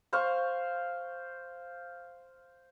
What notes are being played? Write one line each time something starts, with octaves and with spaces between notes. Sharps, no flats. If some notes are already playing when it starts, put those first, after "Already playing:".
C5 F5 C#6